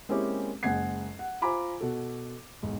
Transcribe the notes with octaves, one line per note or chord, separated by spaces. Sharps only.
G#3 A#3 C4 C#4 E4 G4
F#1 G#3 F#5 G#6 C7
F#5
F4 C5 G#5 A#5 B5 D6
B2 F#4 A4
B1 E2 G#2